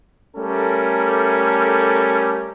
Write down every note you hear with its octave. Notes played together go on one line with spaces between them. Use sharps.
G3 A3 C#4 A4 A#4